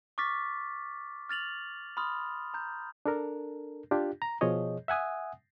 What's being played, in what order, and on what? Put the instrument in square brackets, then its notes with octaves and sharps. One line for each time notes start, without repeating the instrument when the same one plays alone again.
[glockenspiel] C#6 D6 F6 A6 B6
F6 A6 F7 F#7
B5 C6 D#6 F6
A#5 G6
[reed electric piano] D4 A4 A#4
D4 F4 G4
A#5
B2 F3 G#4 C#5 D#5
E5 F#5 G#5 D#6